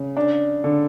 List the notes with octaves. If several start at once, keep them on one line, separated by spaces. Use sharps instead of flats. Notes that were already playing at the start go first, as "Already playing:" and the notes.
Already playing: C#3
D4
D3